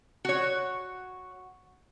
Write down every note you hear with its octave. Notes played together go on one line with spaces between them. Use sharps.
F#4 C#5